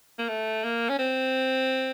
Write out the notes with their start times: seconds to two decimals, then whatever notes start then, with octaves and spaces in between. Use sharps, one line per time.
0.19 A#3
0.29 A3
0.64 A#3
0.89 C#4
0.99 C4